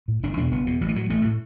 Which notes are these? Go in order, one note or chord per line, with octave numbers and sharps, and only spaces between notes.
A2
F#1 D4
E2 B2 D4
F#1 B3
E2 B2
A1 F#3
E3
A2 F#3
A1 A3
A2